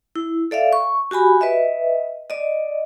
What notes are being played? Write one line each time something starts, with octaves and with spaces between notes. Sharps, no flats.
E4
A4 D5 E5 F5
C#6
F#4 G4 G#5 B5
B4 D#5 E5
D5 D#5